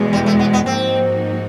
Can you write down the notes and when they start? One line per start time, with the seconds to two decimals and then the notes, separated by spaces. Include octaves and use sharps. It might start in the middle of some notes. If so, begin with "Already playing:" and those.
Already playing: E2 B2 G#3
0.13 G3
0.26 A3
0.39 B3
0.53 B3
0.66 G#2 F3 A#3 C4 D#4 F#4